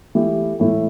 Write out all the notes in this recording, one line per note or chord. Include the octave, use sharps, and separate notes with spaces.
E3 A3 E4 G4
A2 E3 A3 E4